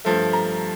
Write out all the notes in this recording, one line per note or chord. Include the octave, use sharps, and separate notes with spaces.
G2 F3 A3
A#5